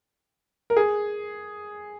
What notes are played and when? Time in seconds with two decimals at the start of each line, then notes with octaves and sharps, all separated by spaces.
0.70 A#4
0.77 G#4